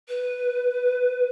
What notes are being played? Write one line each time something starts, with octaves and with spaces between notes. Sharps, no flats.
B4